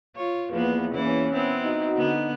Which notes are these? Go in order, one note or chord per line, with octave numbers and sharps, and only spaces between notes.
F4 C#5
E2 F3 A#3 B3 B4
E3 A#3 C#4 E4
B3 C4 E4
D#4 F#4
D3 B3